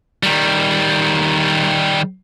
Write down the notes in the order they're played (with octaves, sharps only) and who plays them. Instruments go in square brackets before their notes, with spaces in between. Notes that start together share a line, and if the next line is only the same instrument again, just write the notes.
[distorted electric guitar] D#3 G3